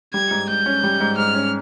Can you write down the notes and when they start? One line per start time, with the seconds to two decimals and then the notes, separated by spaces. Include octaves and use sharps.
0.13 G3 G#6
0.31 G#2
0.49 G#2 G6
0.66 C#4
0.84 G3
1.00 G#2
1.17 G#2 F6
1.35 C#4